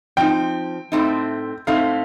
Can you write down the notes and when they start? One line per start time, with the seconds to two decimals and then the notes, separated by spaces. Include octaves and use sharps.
0.17 F3 C4 D#4 G5
0.92 A2 A3 C4 D#4
1.67 A2 A3 C4 D#4 F5